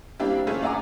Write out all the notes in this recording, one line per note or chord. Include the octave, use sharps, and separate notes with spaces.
G3 A#3 C4 D4 E4 G4
A3 A#3 C#4 E4 F4 G#4
D5 E5 F#5 G#5 A#5 D6